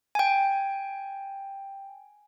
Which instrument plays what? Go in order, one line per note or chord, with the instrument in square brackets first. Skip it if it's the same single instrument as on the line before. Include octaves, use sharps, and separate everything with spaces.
[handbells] G5 G#5